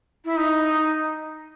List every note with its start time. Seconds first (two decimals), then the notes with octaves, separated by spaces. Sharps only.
0.25 E4
0.36 D#4